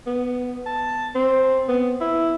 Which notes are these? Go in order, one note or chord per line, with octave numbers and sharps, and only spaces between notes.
B3
A5
C4
B3
E4